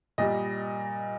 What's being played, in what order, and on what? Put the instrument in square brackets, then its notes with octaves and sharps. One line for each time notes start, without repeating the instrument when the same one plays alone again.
[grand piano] A#2 G3 D#5